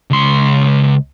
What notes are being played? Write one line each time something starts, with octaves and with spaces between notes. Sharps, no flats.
C#2 C6